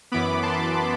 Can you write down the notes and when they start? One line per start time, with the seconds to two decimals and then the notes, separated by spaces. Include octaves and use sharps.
0.12 F#2 E3 B3 B5 D6
0.42 A5 C6